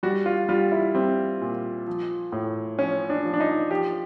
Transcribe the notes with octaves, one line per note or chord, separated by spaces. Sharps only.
G3 F#4
F4
G3 F4
E4
G3 C4
A#2
F3
A2
F3 C#4
D4
F3
D4
D#4
F3 G4